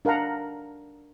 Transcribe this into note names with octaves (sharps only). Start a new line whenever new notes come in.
D4 A#4 F5 F#5 A#5